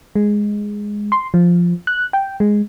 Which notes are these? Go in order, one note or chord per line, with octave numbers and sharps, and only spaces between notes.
G#3
C6
F3
F#6
G5
G#3